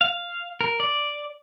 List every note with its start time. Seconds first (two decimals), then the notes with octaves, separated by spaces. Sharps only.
0.01 F5
0.61 A#4
0.80 D5